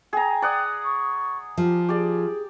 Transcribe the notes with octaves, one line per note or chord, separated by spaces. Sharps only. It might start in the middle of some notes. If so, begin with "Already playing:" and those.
G#4 G5 A#5
D5 F#5 D#6
C#6
F3 G4
G4 G#4 D5